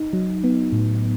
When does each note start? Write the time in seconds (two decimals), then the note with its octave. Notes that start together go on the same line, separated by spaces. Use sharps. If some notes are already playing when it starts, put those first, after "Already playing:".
Already playing: D#4
0.13 F#3
0.44 B3
0.72 A2